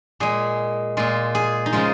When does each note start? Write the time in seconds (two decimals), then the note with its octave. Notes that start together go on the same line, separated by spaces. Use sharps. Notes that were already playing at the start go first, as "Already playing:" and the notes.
0.20 A#2 G#3 G#4
0.97 A#2 G#3 F4
1.35 G#4
1.66 D#4
1.73 C#3 F3 G#3 F4